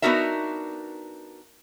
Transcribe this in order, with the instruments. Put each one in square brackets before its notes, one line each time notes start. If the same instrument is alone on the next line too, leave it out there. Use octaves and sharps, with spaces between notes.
[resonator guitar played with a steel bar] B3 D4 D#4 F#4 A#4 E5